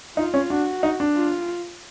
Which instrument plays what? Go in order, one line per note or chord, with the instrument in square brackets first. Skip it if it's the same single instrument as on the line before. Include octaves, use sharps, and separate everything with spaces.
[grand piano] D#4 [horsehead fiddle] F4
[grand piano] C#4
[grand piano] D4 [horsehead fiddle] F#4
[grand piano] D#4
D4
[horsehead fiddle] F4